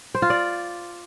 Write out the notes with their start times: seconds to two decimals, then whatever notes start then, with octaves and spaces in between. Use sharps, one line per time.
0.15 C5
0.22 F4
0.30 D5